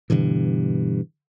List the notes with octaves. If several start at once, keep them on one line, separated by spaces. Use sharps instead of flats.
G2 B2 D3 E3